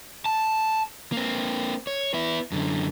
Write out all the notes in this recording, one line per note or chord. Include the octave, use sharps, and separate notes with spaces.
A5
A#3 C4
C#5
B3 E4
F#2 D3